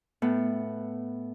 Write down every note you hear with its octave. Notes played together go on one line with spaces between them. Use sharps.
A2 B3